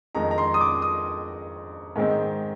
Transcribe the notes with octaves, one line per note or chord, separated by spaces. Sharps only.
F2 D#3 G#3 A#5
A#5
C6
D#6
D6
D#6
G#2 D#3 G#3 C4